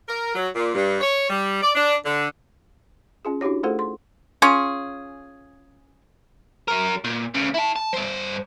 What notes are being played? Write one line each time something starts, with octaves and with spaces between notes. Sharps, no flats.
A#4
F#3
A#2
G2
C#5
G3
D5
D4
D3
C#4 F4 G#4
D4 E4 F#4 G4 C#5
A3 F4 G#4 A4 C5 F#5
C6
C#4 F4 G#4
F#3 A#4
A#2
D2 C#3
E4 A5
A5
G2 C5